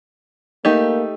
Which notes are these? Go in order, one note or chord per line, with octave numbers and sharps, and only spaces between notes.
A3 A#3 D#4 G4